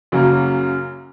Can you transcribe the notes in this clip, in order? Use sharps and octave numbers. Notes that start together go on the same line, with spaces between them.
F#2 C#3 F#3 A#3